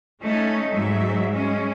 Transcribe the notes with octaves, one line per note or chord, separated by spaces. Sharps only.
A3 C#4 D#4
G#2 F#3 E5
G#3 C#4